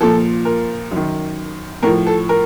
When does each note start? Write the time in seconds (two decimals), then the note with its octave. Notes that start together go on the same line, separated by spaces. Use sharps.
0.01 A#2 F3 A4
0.45 A#4
0.91 F#2 D#3
1.83 A2 F3 A#4
2.07 A4
2.29 A#4